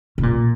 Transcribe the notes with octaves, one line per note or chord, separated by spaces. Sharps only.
C#3
A#2